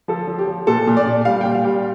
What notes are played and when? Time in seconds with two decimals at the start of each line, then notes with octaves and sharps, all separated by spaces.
0.08 F3 A4
0.28 F3
0.39 G4
0.48 F3
0.67 A#2 A4
0.87 A#2
0.97 D5
1.06 A#2
1.25 G3 F5
1.41 G5
1.45 A#2
1.55 F5
1.64 G3